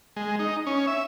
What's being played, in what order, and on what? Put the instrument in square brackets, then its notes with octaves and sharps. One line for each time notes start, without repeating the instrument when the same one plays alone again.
[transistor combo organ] G#3
D#4
C#4
E5